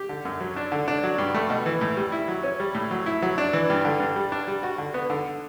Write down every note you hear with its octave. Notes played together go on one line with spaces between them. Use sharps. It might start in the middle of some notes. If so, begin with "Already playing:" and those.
Already playing: G4
D3
F#2
F#3
D4
D3
D4
F#3
G2
A3
B2
E3
A2
G3
E4
F#3
C#4
G3
A2
F#3
E4
F#3
D4
E3
G2
D3
G2
G3
D4
G3
F#4
D3
B3
D3